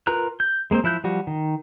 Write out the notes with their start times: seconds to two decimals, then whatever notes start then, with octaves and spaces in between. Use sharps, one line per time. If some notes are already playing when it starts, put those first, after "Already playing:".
0.07 F4 A#4 B4 A#5 F#6
0.40 G6
0.71 G#3 A#3 C4 C5
0.84 F3 E4 F#6 G6
1.04 F3 G3 F#4
1.27 D#3